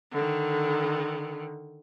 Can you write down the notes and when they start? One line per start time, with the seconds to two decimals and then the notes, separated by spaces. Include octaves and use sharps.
0.11 D3 D#3